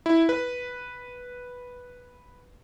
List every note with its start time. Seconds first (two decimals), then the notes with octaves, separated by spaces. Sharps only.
0.06 E4
0.29 B4